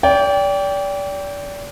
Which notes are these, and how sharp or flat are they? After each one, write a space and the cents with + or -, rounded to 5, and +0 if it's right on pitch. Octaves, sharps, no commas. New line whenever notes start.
D5 -35 G5 +5